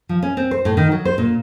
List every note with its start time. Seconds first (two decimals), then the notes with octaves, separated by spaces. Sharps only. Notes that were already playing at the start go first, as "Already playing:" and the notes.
0.09 F3
0.22 C#4
0.37 C4
0.51 C5
0.65 A2
0.77 D#3
0.92 F#3
1.05 C5
1.18 A#2